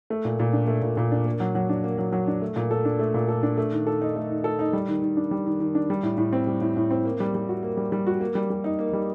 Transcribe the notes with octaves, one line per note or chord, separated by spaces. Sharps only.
A3
A#2
A#2
D4
A3
A#2
A#2
D4
A#3
F#3
F#3
D4
A#3
F#3
F#3
D4
A3
A#2
A4
D4
A3
A#2
A4
D4
A3
D#3
A4
D#4
A3
D#3
A4
D#4
G3
D#3
D#3
D4
G3
D#3
D#3
D4
G3
A2
A2
C4
G3
A2
A2
C4
A#3
G3
G3
F#4
A#3
G3
G3
F#4
A#3
G3
G3
D#4
A#3
G3